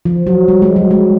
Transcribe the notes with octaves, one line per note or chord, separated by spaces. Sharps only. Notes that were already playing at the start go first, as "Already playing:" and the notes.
F3
F#3
G3
G#3
F#3
G#3